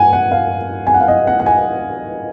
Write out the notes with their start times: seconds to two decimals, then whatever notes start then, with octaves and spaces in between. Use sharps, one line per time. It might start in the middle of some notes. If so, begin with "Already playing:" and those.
Already playing: F#5 G#5
0.13 F#5
0.31 F5
0.87 G#5
0.94 F#5
1.01 F5
1.08 D#5
1.27 F#5
1.40 F#5
1.46 G#5